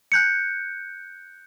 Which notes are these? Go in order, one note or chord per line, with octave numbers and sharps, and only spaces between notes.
F#6 G6 C#7